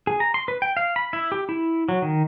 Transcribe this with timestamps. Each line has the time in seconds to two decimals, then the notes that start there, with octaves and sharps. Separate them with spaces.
0.07 G#4
0.20 A#5
0.34 C6
0.48 B4
0.62 G5
0.77 F5
0.96 B5
1.13 E4
1.32 G4
1.49 E4
1.89 F#3
2.02 D#3